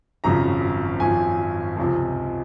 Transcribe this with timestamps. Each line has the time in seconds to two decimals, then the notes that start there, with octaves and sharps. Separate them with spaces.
0.24 G#1 F#2 C#3 F3 A#5
1.00 G#1 F#2 F3 G#5
1.77 C#2 C3 F3